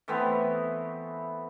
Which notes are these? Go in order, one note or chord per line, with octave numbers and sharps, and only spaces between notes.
E3 A3 B3 C4